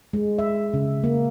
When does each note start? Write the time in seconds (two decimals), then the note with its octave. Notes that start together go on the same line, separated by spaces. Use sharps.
0.13 G#3
0.39 E5
0.74 C#3
1.04 A#3